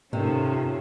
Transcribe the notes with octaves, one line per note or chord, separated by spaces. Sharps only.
G#2 C3 D#3 C#4 F4 A4